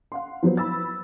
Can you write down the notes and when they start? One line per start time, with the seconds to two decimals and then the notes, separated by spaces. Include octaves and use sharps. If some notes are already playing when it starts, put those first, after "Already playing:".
0.12 F5 F#5 C6
0.43 F3 F#3 B3 C5
0.57 B5 E6 A6